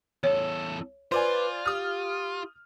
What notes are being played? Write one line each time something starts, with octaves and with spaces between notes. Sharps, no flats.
E2 A4 C#5
F4 B4 C5 D5 G#5
G4 D#6 F6